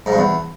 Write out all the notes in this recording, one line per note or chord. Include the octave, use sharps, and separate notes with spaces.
G#2
G2
E2